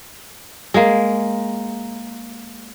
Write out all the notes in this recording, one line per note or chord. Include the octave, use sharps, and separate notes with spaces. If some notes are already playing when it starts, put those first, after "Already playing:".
G#3 A#3